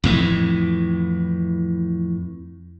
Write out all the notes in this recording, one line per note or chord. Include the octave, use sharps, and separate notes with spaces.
F2 A2 E3